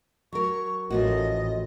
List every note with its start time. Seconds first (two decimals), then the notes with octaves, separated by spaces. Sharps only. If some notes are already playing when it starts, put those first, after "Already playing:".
0.32 F#3 A#4 C#6
0.90 A1 F3 A#3 F#4 D#5